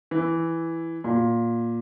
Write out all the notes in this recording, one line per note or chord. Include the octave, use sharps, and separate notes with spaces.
E3
A#2